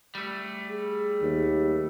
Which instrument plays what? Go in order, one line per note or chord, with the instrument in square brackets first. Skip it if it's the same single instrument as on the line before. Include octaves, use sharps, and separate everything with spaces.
[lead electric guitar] G3 A3
[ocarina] G#4
[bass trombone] D#2